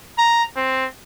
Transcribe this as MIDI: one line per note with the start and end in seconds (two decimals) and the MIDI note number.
0.18 0.44 82
0.56 0.86 60